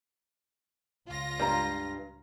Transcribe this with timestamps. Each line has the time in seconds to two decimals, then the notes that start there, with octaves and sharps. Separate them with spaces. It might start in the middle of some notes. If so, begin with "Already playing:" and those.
1.07 C#2 F4 A#6
1.39 G2 A#5